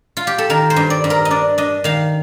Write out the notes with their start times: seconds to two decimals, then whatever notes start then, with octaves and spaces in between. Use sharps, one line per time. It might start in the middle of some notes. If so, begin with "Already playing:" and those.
0.17 F4
0.27 G4
0.38 A4
0.50 D#3 A#4
0.70 C5
0.76 G2
0.90 D5
1.04 G2
1.10 A#4
1.25 D#5
1.31 D4 D5
1.58 D4 D#5
1.84 D#3 F5